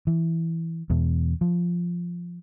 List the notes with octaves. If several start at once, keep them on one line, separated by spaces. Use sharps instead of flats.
E3
E2 B2
F3